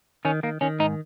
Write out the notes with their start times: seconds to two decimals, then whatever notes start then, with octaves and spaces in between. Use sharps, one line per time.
0.25 D#3 C#4
0.43 D#3 A#3
0.61 D#3 C#4
0.79 G#2 D#4